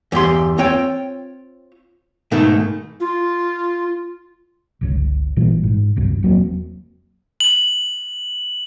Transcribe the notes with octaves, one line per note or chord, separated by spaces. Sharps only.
E2 G2 G4 C6
C4 F4 C#5 G5
G#2 B2 D#3 A3
F4
G1 C#2 C#3
G#1 A#2 E3 G3
G#2
D1 C2 G2
E1 F#3 A#3 C4
F#7